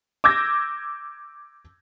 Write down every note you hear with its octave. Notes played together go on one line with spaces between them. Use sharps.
D6 E6 G6 G#6 A#6